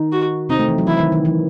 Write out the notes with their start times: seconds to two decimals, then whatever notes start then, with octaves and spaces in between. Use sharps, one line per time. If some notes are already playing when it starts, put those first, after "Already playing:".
Already playing: D#3 D#4
0.12 F#4
0.49 C3 C4 D#4
0.59 A3
0.69 E3
0.78 F#3
0.87 E3 E4
1.00 D#3
1.12 D#3
1.25 E3